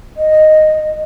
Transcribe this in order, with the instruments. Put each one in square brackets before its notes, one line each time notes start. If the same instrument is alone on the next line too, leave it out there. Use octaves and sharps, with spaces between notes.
[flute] D#5